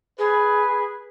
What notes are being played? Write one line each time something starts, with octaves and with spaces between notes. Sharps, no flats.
G#4 B4